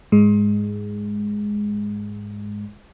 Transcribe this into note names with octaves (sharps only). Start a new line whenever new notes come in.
G#2 G#3